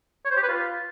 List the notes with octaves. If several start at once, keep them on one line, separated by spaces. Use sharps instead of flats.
C#5
C5
G4
B4
F4